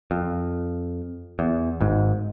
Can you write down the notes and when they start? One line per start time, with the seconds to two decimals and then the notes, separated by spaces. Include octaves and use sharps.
0.11 F2
1.39 E2
1.81 G#1 G#2